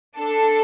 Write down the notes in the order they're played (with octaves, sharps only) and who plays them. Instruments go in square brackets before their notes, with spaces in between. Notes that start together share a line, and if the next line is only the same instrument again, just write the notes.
[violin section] D4 A4 A5